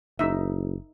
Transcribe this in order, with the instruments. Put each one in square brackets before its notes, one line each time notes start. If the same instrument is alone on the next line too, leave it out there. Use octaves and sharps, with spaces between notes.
[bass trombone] F#1 [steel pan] D#4 E5